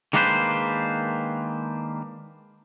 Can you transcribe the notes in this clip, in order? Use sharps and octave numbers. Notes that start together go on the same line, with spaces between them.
D#3 G#3 A#3 D4 B4 C5